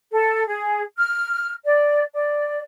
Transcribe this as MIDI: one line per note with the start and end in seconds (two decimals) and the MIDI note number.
0.12 0.46 69
0.46 0.83 68
0.98 1.53 89
1.65 2.05 74
2.14 2.61 74